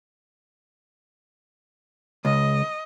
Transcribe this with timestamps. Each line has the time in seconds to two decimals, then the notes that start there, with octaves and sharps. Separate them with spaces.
2.25 C#2 D#5